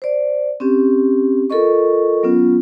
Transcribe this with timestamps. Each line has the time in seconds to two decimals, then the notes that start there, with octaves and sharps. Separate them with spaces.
0.02 C5 D5
0.60 C4 C#4 G4
1.50 F4 A4 A#4 D#5 C#6
2.23 F#3 B3 C#4 F4